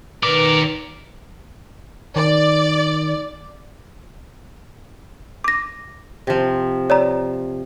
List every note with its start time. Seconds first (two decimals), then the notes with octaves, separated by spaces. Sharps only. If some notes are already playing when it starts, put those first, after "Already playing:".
0.23 D#3 A#4 B4 D5 D6
2.16 D#3 D5
5.44 D6 A#6
6.27 C3 F3
6.90 C#5 D5 A#5